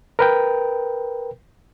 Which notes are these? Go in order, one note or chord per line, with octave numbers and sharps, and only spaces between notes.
A#4 B4 G5